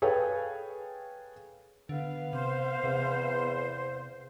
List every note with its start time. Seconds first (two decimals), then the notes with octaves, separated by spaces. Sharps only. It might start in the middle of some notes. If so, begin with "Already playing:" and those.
0.02 G#4 A4 B4 C#5 F5 G5
1.89 D3 B3 F5
2.33 C3 C5
2.84 E2 C3